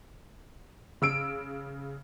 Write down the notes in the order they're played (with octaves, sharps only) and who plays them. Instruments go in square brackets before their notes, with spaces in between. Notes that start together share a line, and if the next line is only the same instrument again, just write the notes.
[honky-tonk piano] C#3 E6 D7